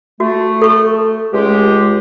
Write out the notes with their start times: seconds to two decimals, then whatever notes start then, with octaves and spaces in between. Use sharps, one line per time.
0.20 A3 F#4
0.62 A4 C#6
1.32 C#2 G#3 G4